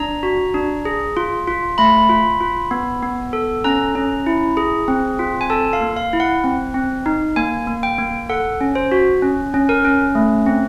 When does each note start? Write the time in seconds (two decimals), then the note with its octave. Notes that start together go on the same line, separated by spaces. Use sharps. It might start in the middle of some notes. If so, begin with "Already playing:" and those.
Already playing: D4 A#5
0.23 F#4
0.54 D4
0.85 G#4
1.17 F4
1.47 F4
1.78 A3 B5
2.09 F4
2.41 F4
2.71 B3
3.02 B3
3.33 A4
3.64 C#4 A#5
3.95 C#4
4.27 E4
4.57 G#4
4.88 C4
5.19 F4
5.41 G#5
5.50 A4 A5
5.73 F5
5.81 A#3
5.96 F5
6.13 E4
6.20 F#5
6.44 C4
6.74 C4
7.06 D#4
7.36 A#3 G#5
7.67 A#3
7.83 G5
7.99 A#3
8.29 A4 F#5
8.61 C#4
8.75 C5
8.92 F#4
9.22 C#4
9.54 C#4
9.69 A#4
9.85 C#4
10.15 A3
10.46 C4